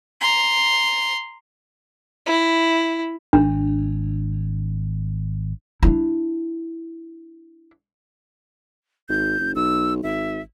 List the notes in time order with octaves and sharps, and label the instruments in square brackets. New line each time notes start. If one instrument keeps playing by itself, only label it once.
[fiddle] A#5 C6
[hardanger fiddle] E4
[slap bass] G#1 [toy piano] D4
[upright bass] D4 E4
[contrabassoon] G#1 [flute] G6
[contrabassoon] F#1
[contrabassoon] B1 [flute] E6
[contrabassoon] G#1 [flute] E5